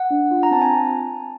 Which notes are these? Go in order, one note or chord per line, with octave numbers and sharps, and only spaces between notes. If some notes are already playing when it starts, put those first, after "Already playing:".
Already playing: F#5
D4
F4
A#5
C4 A5
G#5